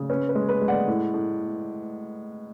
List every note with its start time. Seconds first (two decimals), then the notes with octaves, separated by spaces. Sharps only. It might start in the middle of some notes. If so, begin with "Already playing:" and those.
Already playing: C#3
0.10 C#4 B4
0.29 B4
0.35 G#3
0.49 B4
0.61 G#3
0.68 D5 F#5
0.88 A2
1.14 A2